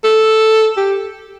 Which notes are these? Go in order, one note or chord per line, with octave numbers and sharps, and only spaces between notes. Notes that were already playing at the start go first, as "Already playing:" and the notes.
A4
G4